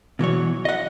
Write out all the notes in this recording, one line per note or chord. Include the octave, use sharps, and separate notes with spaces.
B2 E3 F#3 C#5
D#5 F#5